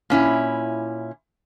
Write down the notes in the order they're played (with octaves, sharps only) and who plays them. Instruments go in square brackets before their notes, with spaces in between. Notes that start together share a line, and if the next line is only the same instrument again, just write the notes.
[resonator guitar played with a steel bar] A#2 C#4 E4